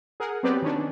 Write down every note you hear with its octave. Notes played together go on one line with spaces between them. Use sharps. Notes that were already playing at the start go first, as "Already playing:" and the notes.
G#4 A#4 F#5
F#3 B3 C4 G4 B4 D5
D#3 C#4 D4